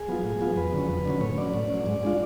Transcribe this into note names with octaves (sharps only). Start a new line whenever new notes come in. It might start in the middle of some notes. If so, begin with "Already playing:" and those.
Already playing: G#4
F#3 B3 F4
A2
F#3 B3 F4
F2 B4
D3 F#3 C#4
F2
D3 F#3 C#4
A2 C#5
F#3 C#4 D5
A2
F#3 C#4
G#2
G#3 D4 F4